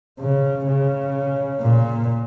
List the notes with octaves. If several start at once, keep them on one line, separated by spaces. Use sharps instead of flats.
C#3
C#3
A#2